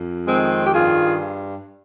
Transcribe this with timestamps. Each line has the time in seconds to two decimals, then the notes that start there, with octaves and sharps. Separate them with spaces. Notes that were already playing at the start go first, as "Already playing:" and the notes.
Already playing: F2
0.27 D#3 G#3 C4
0.67 G4
0.74 G2 F4 G#4